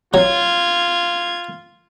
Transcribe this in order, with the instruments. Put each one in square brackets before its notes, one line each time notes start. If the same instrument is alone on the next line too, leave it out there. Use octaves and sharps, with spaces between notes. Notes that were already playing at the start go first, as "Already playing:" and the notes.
[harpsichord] F#3 [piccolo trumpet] F4 [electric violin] G#6